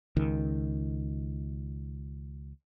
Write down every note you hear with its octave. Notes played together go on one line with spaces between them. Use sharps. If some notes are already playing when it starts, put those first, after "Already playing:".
C#2 D#3